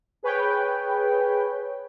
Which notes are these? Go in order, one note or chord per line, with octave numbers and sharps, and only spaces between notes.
G#4 B4 C#5 G5